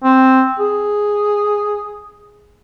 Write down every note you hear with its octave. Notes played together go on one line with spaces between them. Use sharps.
C4
G#4